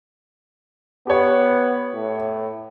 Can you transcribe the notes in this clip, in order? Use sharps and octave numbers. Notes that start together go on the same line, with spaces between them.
B3 G4 C#5
A2